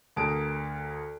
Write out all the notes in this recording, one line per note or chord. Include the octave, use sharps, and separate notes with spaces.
D2 G#4 A#4 A5 D7